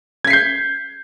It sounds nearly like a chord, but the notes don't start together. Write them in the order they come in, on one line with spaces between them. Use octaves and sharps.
G#6 B6 C7 G6